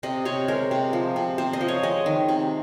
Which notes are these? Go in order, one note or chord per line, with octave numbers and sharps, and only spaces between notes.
C3 D#5
C3 C#5
G#3 A#4
C3
F3
C3
C3 C5
D#5
F3
C#5
G#3 D#5
D#3
C3